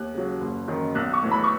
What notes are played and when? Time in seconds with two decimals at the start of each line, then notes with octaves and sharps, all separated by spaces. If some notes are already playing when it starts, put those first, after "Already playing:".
Already playing: D#2 F#6
0.14 C#3 F#3
0.41 F#1
0.68 F#2 D#3
0.95 B1 F#6
1.13 C#6
1.22 A2 E3
1.31 B5
1.44 C#6